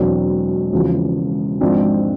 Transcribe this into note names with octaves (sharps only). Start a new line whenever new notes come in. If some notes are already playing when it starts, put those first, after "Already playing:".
Already playing: E1 E2 B2 F#3 C4 D4
E1 E2 C#3 F3
G#1 G#2 F3 C4 D4